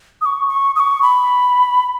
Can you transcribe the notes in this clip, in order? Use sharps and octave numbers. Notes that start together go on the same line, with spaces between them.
D#6
C#6
C#6
D#6
C#6
B5